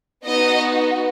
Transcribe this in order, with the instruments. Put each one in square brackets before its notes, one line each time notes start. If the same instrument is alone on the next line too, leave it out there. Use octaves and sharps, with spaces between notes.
[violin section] B3 D#4 F#4 D#5